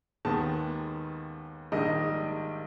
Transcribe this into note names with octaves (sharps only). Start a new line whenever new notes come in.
D#2 D#3 G#3 B3 A5
A#1 G#2 D#3 G3 D#5